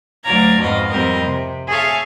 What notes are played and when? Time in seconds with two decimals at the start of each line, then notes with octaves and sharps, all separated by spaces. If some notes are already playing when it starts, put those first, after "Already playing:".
0.24 D2 F#3 D5 F5 A#5 G#6
0.60 F2 G#2 B2 F#4 D#5 F5
0.89 F2 G3 C4 A#4 D#5
1.25 C3
1.69 G#4 A4 C#5 E5 F5